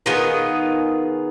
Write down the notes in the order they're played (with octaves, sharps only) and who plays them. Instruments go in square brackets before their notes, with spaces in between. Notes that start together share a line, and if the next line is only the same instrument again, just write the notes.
[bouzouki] D#3 B3 F4 G#4